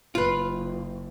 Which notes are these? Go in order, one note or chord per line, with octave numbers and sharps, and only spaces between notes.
F#1 F4 B4